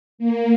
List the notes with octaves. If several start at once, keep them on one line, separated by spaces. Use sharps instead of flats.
A#3